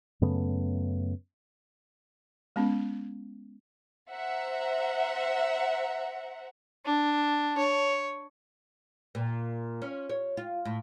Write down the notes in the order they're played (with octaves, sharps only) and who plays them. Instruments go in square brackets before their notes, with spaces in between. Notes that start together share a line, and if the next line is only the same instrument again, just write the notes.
[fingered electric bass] F#2 C#3 A3 B3
[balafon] G#3 B3 C#4
[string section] C5 E5 F#5 A#5
[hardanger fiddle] D4
C#5
[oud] A#2
C#4
C#5
F4
A2